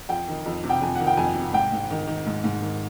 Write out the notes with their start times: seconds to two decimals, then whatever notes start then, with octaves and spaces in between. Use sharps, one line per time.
0.09 F2 G5
0.28 D#3
0.46 F2
0.64 C3
0.70 G5
0.81 F2 G#5
0.95 D#3 F#5
1.07 G5
1.17 F2 G#5
1.35 C3
1.53 G#2 G5
1.72 G#2
1.90 D#3
2.07 D#3
2.26 G#2
2.44 G#2
2.62 D#3